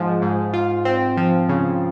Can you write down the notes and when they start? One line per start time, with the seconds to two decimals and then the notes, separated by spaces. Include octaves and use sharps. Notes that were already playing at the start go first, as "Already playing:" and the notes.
Already playing: G#2 F3 G#3
0.22 G#2
0.53 F4
0.85 C4
1.17 F3
1.49 C#3